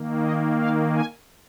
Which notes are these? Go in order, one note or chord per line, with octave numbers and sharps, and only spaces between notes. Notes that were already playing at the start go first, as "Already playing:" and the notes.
Already playing: D#3 A#3
D#5
F5
G#5